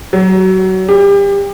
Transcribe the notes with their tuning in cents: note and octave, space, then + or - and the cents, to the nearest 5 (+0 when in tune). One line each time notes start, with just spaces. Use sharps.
F#3 +25
G4 +30